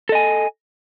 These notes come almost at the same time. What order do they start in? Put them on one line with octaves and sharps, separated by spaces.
A4 D#5 G#5